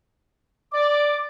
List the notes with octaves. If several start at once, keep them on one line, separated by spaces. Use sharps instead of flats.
D5 D6